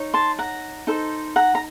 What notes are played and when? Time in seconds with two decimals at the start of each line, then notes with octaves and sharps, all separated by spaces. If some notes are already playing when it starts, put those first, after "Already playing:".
Already playing: D#4 C#5
0.14 A5 C6
0.39 F#5 A#5
0.87 D#4 A4 C5
1.36 F#5 A#5
1.55 A#5